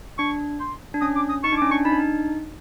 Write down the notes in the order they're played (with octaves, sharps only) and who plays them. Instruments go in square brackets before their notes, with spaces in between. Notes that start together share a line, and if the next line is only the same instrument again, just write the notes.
[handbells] D4 [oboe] C#6
[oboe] C6
[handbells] D4
[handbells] C#4 [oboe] D#6
[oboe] D6
D#6
[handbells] D#4 [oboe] C#6
[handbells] D4
[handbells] C#4 [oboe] D6
[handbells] D4 [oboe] C#6
[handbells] D#4 [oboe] B5
[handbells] D4
D#4